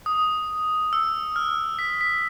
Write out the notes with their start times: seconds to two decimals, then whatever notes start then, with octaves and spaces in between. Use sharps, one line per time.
0.06 D#6
0.93 E6
1.36 F6
1.79 B6
2.01 B6